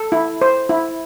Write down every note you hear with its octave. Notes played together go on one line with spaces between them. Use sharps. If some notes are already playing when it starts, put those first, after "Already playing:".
Already playing: A4
E4
C5
E4